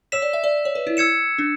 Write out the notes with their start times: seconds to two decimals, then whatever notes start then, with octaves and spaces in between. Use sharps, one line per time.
0.12 C#5 E6 B6 E7
0.22 D5
0.33 E5
0.44 D5
0.65 C#5
0.75 B4
0.87 E4
0.97 E6 G#6 C#7 E7
1.38 D4